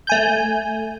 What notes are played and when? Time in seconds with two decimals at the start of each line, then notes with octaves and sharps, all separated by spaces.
0.07 A3 G#5 G6